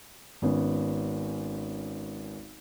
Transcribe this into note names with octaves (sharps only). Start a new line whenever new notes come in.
G#1 B3 C#4